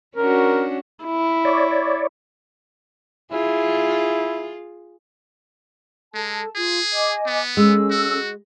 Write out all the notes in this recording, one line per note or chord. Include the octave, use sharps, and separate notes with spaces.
C#4 D4 F#4 A#4
E4
C#5 D5
E4 F4 G#4
G#3 A4 A5
F4 G#4
D#5 G#5 D6
B3
G#3 C#4 A4 E6
F#4